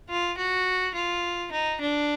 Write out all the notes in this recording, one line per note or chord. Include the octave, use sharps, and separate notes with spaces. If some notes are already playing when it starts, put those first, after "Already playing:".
F4
F#4
F4
D#4
D4